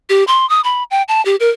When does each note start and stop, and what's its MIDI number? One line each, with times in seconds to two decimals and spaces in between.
0.10 0.24 67
0.27 0.48 84
0.50 0.61 87
0.64 0.83 83
0.91 1.02 79
1.08 1.24 81
1.25 1.36 67
1.40 1.50 70